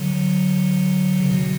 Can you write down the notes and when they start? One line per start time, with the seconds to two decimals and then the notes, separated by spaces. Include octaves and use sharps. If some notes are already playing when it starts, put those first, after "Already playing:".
Already playing: D3 F#3
1.20 C#3
1.31 B2 D3